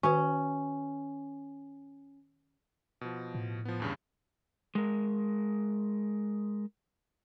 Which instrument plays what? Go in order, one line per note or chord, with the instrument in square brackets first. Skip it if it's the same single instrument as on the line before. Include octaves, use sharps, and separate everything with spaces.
[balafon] D#3 F#4 B4 [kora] C#4
[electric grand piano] B2 F3
[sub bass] A2
[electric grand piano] F3 B3
E2 G2 C#3
[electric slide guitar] G#3 A#4